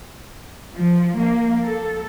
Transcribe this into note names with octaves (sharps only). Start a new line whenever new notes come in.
F3
A#3
A4